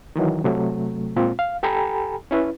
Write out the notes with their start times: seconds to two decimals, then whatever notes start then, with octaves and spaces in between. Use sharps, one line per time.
0.16 D#3 E3 F#3
0.44 C3 F#3 A3
1.16 A#2 G#3 C4 F4
1.39 F5
1.63 G4 A4 G5 G#5 A#5 B5
2.31 C#4 E4 B4